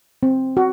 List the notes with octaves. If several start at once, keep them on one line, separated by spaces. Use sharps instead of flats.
C4
F#4